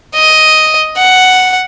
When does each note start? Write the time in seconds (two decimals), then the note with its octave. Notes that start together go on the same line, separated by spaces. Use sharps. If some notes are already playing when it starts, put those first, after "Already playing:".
0.15 D#5
0.98 F#5